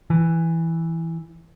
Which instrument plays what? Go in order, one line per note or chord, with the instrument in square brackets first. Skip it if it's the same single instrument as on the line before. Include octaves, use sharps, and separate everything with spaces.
[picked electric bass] E3